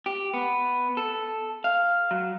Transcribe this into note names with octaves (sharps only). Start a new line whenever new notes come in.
G4
B3
A4
F5
F#3